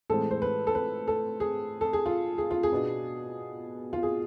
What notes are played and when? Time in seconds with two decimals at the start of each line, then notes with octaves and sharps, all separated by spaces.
0.10 A2 E3 G#3 C4 A4
0.31 C5
0.42 B4
0.67 A4
0.75 B4
1.08 A4
1.40 G#4
1.81 A4
1.93 G#4
2.06 F4
2.38 G#4
2.51 F4
2.63 G#4
2.72 B2 B3 D4
3.93 F4
4.03 G#4